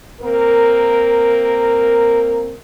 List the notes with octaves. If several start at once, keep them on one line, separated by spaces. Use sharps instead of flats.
A#3 C4 A#4